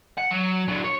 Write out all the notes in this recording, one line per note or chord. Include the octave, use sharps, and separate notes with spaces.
F#5
F#3
D3 F#3
C#5